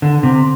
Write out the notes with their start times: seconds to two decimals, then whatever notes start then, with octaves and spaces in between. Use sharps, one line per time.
0.02 D3
0.23 C3